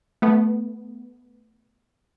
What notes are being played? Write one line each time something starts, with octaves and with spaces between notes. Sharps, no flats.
A3 B3